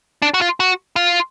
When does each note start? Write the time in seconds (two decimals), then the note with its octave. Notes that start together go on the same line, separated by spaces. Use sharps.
0.22 D4
0.34 F#4
0.41 F4
0.60 F#4
0.96 F4